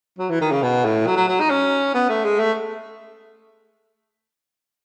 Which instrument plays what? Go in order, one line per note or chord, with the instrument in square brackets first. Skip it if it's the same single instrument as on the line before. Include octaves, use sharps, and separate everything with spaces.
[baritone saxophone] F#3
E3
D#3
C#3
B2
A2
F#3
F#3
F#3
D#4
C#4
B3
A3
G#3
A3